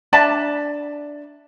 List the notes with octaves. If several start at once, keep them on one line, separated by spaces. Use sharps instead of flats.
D4 D5 E5 A5